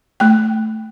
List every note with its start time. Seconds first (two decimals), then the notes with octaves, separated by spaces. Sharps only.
0.20 A3 G5